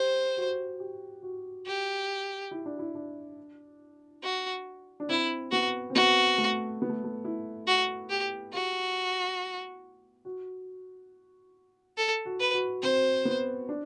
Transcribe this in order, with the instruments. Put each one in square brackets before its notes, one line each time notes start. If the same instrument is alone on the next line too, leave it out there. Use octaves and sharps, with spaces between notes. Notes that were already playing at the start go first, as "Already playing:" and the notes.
Already playing: [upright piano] G4 [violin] C5
[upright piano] F#4
G4
F#4
[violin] G4
[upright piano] E4
D4
E4
D4
[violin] F#4
[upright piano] D4
[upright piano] C4 [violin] E4
[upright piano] B3 [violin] F#4
[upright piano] C4
[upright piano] B3 [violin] F#4
[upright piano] A3
B3
A3
A3
E4
[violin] F#4
G4
[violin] F#4 [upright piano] G4
[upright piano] F#4
[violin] A4
[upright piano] F#4
[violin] B4
[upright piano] F#4
[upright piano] C4 [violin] C5
[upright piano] B3
D4